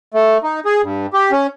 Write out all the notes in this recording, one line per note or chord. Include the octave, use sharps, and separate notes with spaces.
A3
D#4
G#4
G2
G4
C#4